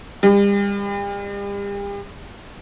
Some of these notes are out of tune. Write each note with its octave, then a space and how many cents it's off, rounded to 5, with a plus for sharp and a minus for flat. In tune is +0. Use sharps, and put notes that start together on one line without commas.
G3 +40